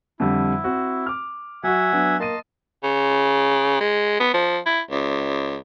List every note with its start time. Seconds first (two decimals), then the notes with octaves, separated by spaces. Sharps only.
0.20 F2 D3 G3 E4
0.64 C4 F#4
1.06 D6 F6
1.63 F#3 F#4 E5 F#5 G#5
1.93 F#3 B3 D4
2.20 A#3 D#5 A5 C6 D#7
2.83 C#3
3.80 G#3
4.20 B3
4.34 F3
4.66 E4
4.90 C#2